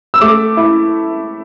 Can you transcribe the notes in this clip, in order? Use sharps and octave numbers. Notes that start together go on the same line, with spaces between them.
E6
A3 D6
E4